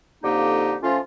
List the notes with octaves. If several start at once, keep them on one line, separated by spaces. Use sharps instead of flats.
F2 D3 A#3 D#4 G4
F3 A3 C#4 F4